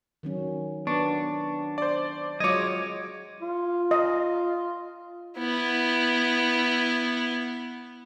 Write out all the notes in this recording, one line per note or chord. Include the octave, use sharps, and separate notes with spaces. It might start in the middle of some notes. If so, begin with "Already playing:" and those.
D#3 F#3 C#4
B3 D4 C#6
C5 D5
F#3 G#3 F4 C#5 D#5 D6 G#6
F4
D#5
B3 E4